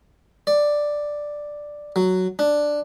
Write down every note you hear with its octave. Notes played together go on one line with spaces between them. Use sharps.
D5
F#3
D4